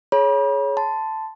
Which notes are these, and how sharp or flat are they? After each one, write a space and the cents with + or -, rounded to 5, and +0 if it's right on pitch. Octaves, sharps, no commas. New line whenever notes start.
G#4 +20 C#5 +0 B5 -40
A5 +0 C6 -20